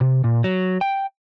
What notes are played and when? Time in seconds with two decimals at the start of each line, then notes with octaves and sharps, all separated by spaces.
0.01 C3
0.24 A#2
0.44 F#3
0.81 G5